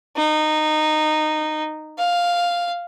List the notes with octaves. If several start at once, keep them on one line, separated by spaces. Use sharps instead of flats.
D#4
F5